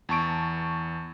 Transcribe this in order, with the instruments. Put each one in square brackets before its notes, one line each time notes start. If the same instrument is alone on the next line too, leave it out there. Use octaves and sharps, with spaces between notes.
[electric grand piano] E2 A5 C#6 D7